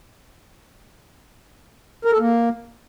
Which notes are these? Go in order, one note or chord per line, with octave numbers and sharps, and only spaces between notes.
A#4
A4
A#3